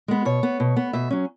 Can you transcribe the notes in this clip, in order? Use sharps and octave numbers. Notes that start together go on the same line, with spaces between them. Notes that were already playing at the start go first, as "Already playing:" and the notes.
G#3 B3
B2 C#5
B3
B2
B3
B2 E5
F#3 C#4